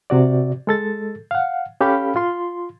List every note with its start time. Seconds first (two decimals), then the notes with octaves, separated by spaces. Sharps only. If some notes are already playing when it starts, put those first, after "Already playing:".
0.10 C3 F#4 D5
0.67 G#3 A4 A6
1.31 F5 F#5
1.81 C#4 G4 A4 F5 B5
2.16 F4 C6